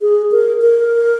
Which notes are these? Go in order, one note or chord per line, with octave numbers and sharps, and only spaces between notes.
G#4
A#4
A#4